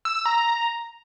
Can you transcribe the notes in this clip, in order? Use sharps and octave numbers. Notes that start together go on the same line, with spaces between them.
E6
E6
A#5